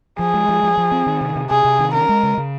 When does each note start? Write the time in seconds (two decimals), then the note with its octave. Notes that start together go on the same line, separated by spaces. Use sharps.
0.19 F3 G#4
0.34 G#3
0.49 F3
0.63 F3
0.78 F3
0.92 C4
1.07 D#3
1.21 C3
1.36 C3
1.50 C3 G#4
1.65 C3
1.79 D#3
1.94 C#4 A#4
2.09 G#3
2.23 C#3
2.38 C#3